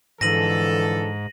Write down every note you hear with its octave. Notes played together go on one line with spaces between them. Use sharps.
G#2 D3 E3 F3 A4 A#6 D#7 F#7